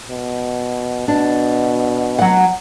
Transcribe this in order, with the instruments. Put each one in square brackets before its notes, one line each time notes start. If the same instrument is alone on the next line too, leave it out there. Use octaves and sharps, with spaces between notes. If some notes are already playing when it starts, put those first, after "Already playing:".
[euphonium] B2
[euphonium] B2 [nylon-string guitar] D4
[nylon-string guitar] F#3 F#5